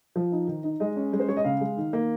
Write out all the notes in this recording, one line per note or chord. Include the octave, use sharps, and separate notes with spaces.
F3
D#4
D#3
D#4
G#3 D#5
C#4
G#3
C5
G#3 C#5
D#5
C#3 F5
G#3
D#3
A#3